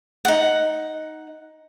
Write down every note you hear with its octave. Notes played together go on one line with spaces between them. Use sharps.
D#4 F#5